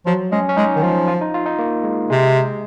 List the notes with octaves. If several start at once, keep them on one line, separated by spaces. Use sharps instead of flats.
F3 F#3
G#3 C#4
C#4
G#3 D#4
D#3
F3 F4
F4
D#4
F4
D#4
A#3
G#3
C3 G#3